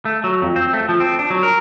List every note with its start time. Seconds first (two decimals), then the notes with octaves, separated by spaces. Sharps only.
0.05 A3
0.24 F#3
0.42 F2
0.56 C4
0.73 A3
0.89 F3
1.00 C4
1.19 D4
1.30 F#3
1.43 A#4